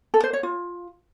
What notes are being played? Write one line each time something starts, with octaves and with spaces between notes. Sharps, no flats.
A4
C5
C#5
F4